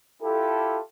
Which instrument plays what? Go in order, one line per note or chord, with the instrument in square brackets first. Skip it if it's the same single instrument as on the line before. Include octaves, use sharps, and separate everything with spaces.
[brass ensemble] E4 F4 G4 A4